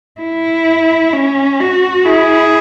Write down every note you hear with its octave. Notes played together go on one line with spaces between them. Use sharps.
E4
C#4
F#4
E4 G#4